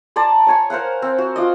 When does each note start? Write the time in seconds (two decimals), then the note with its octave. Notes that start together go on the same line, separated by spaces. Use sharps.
0.16 D5 A5 A#5 C6
0.47 C#5 G#5 C#6
0.70 A#4 C5 F5 F#5
1.02 C4
1.18 F#4
1.36 F4 D5 D#5